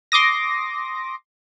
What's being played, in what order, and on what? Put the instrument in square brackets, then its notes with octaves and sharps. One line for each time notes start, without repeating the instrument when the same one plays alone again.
[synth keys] C6 D6 D#6 A#6